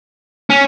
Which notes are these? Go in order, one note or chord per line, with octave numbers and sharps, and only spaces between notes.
C#4